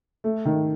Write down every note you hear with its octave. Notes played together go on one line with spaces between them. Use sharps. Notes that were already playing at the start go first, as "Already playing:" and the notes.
A3
D#3